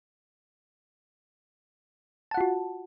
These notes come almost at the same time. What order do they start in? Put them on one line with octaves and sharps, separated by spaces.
A5 F#5 F4 F#4